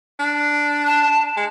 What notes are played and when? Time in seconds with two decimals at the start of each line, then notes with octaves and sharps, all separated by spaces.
0.19 D4
0.87 A5
1.37 G#3